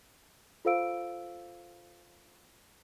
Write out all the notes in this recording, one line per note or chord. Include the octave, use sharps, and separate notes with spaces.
F4 A4 C5 F5 E6 D7